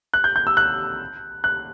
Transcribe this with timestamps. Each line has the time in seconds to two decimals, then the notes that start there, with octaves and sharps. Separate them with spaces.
0.14 F#6
0.24 G6
0.36 G6
0.47 E6
0.57 F#6
1.44 F#6